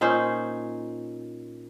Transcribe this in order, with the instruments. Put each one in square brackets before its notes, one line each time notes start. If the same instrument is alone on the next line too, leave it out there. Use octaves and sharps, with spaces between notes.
[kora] A#2 C#4 D#4 C5